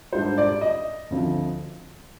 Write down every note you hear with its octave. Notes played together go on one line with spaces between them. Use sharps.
G#2 G3 D4 C5
D5
D#5
D2 D3 F3 C4